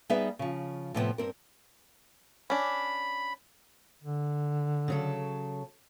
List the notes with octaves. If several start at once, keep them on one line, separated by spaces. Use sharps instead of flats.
G3 B3 D#4 G#4 B4 E5
C#3 F3
A2 C3 F3 G3 B3 C4
G2 C4 A#4
C#4 D4 B5
D3
C#3 F#3 A4